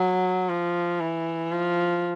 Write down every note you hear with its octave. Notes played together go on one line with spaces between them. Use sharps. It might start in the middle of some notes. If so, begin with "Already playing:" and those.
Already playing: F#3
F3
E3
F3